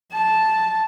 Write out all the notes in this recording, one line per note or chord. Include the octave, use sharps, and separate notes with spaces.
A5